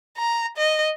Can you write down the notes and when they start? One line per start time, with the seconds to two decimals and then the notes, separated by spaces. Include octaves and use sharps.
0.17 A#5
0.57 D#5